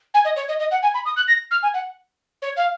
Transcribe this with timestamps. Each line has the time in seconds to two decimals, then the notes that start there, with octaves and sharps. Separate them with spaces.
0.14 G#5
0.25 D#5
0.36 C#5
0.48 D#5
0.59 D#5
0.71 F#5
0.83 G#5
0.94 B5
1.05 D#6
1.16 F#6
1.28 A#6
1.51 F6
1.63 G#5
1.74 F#5
2.42 C#5
2.57 F5